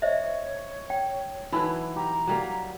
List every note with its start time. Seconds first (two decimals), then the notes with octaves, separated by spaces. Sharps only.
0.02 C5 C#5 D#5 E5
0.90 G5
1.52 E3 F#3 D#4 B4 B5 E6
1.96 G4 A#5
2.27 F#3 G3 A#3